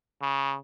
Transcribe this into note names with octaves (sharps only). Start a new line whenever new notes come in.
C#3